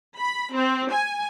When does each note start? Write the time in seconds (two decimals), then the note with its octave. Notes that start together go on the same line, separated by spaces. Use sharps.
0.19 B5
0.54 C4
0.92 G#5